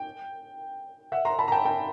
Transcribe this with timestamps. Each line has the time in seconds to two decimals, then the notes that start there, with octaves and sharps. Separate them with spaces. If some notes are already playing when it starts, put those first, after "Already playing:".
Already playing: G5
1.12 E5 F#5
1.25 A#5 C6
1.39 A5 B5
1.48 A#5
1.52 G5 A5
1.65 G5 A5